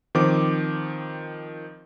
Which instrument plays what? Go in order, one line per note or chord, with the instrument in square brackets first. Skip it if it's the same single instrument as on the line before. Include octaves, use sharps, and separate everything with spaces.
[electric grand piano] D#3 F3 C4 D6